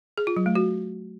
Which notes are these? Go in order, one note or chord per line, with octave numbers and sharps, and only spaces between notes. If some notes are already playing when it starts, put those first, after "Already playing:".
G#4
F4
F#3
A3
F#4